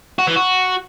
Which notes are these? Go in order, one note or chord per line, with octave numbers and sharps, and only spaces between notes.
F#4
E3
F#4